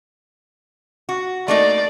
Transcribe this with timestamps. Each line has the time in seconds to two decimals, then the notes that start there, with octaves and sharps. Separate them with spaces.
1.09 F#4
1.48 A3 A#3 D#4 D5